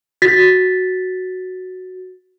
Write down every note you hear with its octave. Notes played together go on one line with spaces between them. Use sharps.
F#4 A6 B6